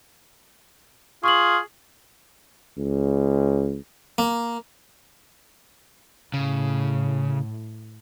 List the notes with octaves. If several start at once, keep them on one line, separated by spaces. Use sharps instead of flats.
F4 G#4 C#6 F6 F#7
C#2
A#3
A2 C#3